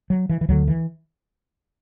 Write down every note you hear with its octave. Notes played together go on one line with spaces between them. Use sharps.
F#3
E3
E3
D2 D3 F#3
E3